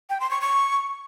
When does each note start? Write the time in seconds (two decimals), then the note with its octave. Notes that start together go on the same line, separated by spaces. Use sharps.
0.10 G5
0.20 C6
0.31 C#6
0.41 C#6